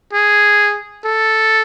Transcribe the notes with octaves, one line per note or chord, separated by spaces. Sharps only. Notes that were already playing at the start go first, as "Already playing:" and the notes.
G#4
A4